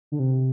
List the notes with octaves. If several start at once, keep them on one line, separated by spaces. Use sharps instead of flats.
D3
C3